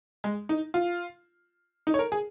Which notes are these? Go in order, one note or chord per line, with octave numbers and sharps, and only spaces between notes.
G#3
D#4
F4
D#4
C#5
A#4
G#4